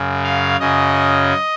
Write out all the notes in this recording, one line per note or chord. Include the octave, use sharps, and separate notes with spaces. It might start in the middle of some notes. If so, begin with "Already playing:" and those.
Already playing: F#2 C#3
F5
F#2 C#3 D#5